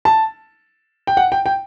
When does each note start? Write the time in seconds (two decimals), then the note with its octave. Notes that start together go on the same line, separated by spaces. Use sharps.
0.05 A5
1.07 G5
1.17 F#5
1.32 G5
1.46 G5